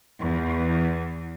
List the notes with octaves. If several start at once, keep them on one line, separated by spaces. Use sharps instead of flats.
E2